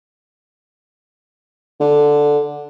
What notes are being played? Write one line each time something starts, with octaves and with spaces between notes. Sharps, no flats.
D3